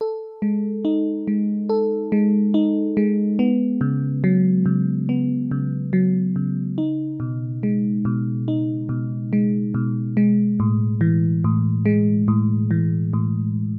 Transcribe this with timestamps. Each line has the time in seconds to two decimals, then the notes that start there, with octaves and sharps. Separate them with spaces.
0.01 A4
0.42 G#3
0.85 D#4
1.27 G#3
1.69 A4
2.12 G#3
2.54 D#4
2.97 G#3
3.39 B3
3.81 C#3
4.24 F#3
4.66 C#3
5.09 B3
5.51 C#3
5.93 F#3
6.36 C#3
6.78 D#4
7.20 B2
7.63 G#3
8.05 B2
8.48 D#4
8.89 B2
9.33 G#3
9.74 B2
10.17 G#3
10.60 A2
11.01 E3
11.44 A2
11.86 G#3
12.28 A2
12.71 E3
13.13 A2